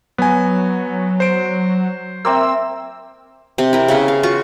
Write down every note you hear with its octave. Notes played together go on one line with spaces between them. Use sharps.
F#3 B3 G#5
C5 D7
A#3 C4 E5 E6
C3 C4
E4 A#4
C#3 B3 E4
F5
F4 F#4 C#6